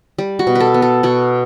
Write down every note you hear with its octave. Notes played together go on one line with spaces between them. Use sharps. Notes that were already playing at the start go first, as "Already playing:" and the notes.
G3
F#4
B2
B4
A4
B3
A4
B2 F#4